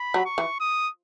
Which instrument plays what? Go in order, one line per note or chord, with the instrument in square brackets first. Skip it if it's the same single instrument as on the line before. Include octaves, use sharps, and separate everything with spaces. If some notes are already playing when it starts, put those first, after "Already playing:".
Already playing: [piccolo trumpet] B5
[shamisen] F#3
[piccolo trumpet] C#6
[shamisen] E3
[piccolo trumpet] D#6